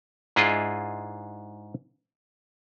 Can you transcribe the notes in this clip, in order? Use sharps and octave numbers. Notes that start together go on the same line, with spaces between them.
G#2 D4 E4 F4 G#4 D#5